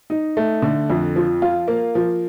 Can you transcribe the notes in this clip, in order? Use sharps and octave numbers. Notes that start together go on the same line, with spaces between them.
D#4
A3
D3
F2
F3
F4
A#3
F3